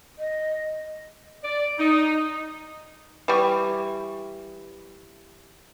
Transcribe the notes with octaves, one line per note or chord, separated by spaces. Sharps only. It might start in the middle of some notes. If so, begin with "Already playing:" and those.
D#5
D5
D#4
E3 G3 C#6